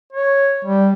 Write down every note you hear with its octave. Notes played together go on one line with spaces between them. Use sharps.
C#5
G3